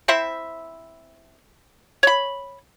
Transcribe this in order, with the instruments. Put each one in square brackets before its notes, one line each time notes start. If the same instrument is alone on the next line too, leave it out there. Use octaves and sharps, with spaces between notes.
[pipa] C4 E4 C5 E5
C#5 B5